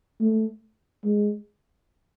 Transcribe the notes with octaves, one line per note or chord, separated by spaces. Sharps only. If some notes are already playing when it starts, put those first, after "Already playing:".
A3
G#3